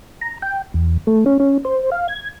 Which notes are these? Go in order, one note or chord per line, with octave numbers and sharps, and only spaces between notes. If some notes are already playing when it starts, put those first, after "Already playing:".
A#5
G5
E2
A3
C#4
C#4
C5
F5
G#6